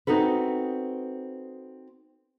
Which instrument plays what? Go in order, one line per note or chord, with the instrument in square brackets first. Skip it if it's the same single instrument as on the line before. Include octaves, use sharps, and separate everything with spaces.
[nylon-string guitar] C4 D#4 F#4 A4 B4